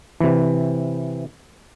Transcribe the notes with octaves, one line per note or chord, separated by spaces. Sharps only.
C3 E3